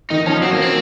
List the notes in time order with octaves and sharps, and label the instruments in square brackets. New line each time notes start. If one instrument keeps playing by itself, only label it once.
[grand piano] D#3 [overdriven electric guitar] D#4
[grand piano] F3 [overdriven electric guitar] C#4
[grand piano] F#3 [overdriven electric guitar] C4
[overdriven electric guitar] A#3
C4